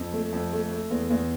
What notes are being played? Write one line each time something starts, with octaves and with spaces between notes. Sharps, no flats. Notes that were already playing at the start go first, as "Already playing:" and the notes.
Already playing: F2
A3
F2
A3
A3
E2
E2